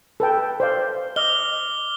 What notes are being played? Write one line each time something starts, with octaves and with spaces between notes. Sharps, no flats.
A4 B4 G5
C5 D5 F5
D#5 D6 F6 G7